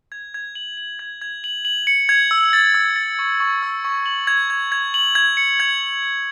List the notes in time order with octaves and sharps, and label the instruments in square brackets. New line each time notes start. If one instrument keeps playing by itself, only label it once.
[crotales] G#6
G#6
F#7
F#7
G#6
G#6
F#7
F#7
C#7
G#6
E6
A6
E6
A6
C#6
C#6
E6
C#6
F#7
G#6
G#6
G#6
F#7
G#6
C#7
G#6
C#7
C#7